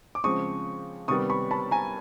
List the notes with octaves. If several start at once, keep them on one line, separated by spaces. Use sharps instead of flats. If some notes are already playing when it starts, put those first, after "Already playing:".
D6
C#3 F3 G#3 C4 C#6 D#6
C3 D#3 G3 B3 C#6 D#6
B5 C#6
A5 B5
G#5 A#5